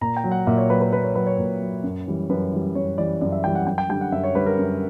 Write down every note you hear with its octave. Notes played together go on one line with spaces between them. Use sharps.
A#2 A#5
G5
F#3
F#5
A#2 E5
C#5
F#3 B4
B4
A#2 B4
C#5
F#3 B4
C#5
A#2
F#3
F#2
E3 G3
F#2 B4
E3 G3
F#2 C#5
E3 G3 D5
F#2 D5
E5
E3 G3 G5
F#5
F#2 G5
G5
D3 G3 G5
F#5
F#2 E5
C#5
D3 G3 B4
A#4
F#2